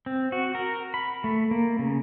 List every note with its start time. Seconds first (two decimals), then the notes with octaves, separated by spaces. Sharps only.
0.06 C4
0.32 F#4
0.55 A#4
0.94 B5
1.24 A3
1.51 A#3
1.79 C#3